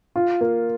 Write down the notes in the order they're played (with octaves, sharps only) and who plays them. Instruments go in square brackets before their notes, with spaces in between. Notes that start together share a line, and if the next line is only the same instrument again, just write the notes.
[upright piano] F4
A#3